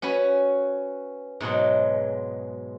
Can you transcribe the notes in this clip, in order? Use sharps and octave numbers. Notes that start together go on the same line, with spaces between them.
C#4 F#4 B4 G#5
G#2 B2 F#3 G#3